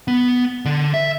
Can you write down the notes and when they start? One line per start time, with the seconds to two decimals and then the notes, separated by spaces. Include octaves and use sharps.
0.08 B3
0.65 D3
0.94 E5